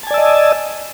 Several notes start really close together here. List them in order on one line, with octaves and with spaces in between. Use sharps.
A5 G#5 D5 E6 D#5